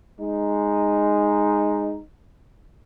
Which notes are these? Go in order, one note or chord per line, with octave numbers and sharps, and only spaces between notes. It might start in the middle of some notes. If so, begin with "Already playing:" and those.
G#3 D#4